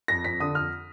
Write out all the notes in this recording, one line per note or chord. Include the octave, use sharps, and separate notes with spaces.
F2 A#6
F2 B6
D3 D#6
F2 F6